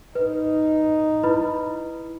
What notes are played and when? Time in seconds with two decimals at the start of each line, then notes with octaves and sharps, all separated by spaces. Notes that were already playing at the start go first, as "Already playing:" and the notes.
0.15 D#4 B4
1.24 E4 B4 B5